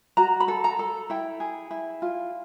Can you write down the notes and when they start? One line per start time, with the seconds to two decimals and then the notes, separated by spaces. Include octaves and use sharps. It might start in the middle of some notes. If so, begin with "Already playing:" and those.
0.17 F#4 A#5
0.40 B5
0.48 A4
0.64 A#5
0.79 A4
1.10 E4 G5
1.40 G#4
1.71 E4
2.02 F4